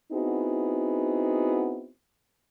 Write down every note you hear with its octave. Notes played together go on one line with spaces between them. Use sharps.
B3 C4 D#4 E4 F#4 G#4